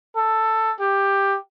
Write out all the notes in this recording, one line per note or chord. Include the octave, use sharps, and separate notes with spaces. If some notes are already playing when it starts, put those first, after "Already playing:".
A4
G4